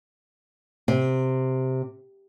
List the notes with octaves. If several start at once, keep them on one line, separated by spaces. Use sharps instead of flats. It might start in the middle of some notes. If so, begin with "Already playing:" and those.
C3